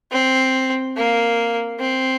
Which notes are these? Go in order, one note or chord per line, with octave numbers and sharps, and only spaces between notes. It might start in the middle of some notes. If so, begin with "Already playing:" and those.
C4
A#3
C4